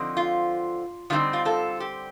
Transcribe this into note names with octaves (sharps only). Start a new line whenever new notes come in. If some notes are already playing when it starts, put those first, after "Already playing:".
Already playing: D3 F3 C4 D#4
F4
D3 G3 C4 D#4 F4
F4
F4 A4
G4